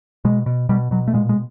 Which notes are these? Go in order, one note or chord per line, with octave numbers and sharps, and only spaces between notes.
B2 G#3
B2
B2 G3
B2 F#3
A3
A#2 G#3
G#3